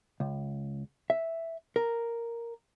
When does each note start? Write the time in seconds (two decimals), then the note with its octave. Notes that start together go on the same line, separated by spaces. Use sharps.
0.20 C#2
1.10 E5
1.76 A#4